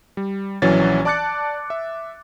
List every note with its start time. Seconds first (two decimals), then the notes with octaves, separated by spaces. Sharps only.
0.17 G3
0.62 A#1 E3 F#3 C#4 C#5 A6
1.05 D5 A5 D6 F#6 A6 C#7
1.70 E5